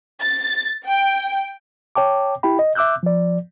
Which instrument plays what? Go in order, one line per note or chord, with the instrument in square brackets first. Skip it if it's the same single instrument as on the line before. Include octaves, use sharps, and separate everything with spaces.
[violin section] A6
G5
[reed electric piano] C#5 G5 A5 D6
E4 G4 G5 B5
D#5
E5 D6 E6 F#6 G6
F3 D5